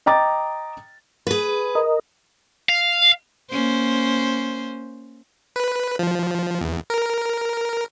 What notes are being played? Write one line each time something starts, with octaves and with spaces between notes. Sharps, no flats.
D#5 G5 A#5 D6 A6
G#4 B4
A#4 D#5
F5
A#3 C#4 C5
B4
F3
E2
A#4